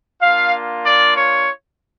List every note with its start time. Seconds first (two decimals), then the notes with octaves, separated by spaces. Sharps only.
0.22 A#3 D4 F4 F5
0.86 D5
1.17 C#5